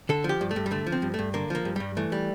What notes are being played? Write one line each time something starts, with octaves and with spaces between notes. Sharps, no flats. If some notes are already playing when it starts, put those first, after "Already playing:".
D3 A4
F3
G4
G2
A3
G2
G3
D3 A3
F3
C4
G2
G2 A3
D3 A#3
F3 A#3
G2
G2 G3
E3 A3
G3